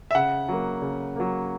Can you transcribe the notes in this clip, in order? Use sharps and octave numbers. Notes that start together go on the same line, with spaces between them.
E5
C#3 F#5
F#3 A#3
C#3
F#3 A#3